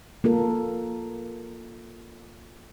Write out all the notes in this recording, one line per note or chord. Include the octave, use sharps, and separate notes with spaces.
A#3 F4 A4 A#4